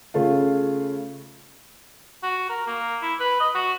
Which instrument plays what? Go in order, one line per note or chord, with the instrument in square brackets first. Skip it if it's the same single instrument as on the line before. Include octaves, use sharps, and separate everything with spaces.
[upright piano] C#3 A3 F4
[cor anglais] F#4
A#4
A#3
E4
B4
D#5
F#4